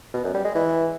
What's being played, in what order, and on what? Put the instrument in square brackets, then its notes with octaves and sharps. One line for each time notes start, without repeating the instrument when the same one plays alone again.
[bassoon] B2
F#2
G3
G#3
E3